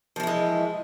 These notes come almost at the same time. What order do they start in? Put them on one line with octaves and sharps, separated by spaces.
F3 E3 E4 G#3